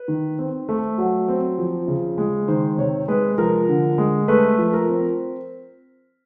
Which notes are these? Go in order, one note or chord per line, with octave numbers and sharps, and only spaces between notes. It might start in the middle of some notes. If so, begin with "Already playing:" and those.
Already playing: B4
D#3
C4
A3
F#3
C4
F3
C#3
G#3
D#3 C5
C3 C#5
G#3 B4
F3 A#4
D3
G#3
A3 B4
F3
A#4
C4